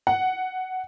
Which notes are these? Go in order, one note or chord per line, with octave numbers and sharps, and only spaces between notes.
F#5